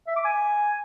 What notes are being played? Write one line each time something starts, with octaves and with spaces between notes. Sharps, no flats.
E5
D6
G#5